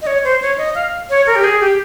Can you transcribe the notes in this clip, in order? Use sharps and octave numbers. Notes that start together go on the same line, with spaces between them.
D#5
C#5
C5
C#5
D#5
F5
C#5
A#4
G4
G#4
G4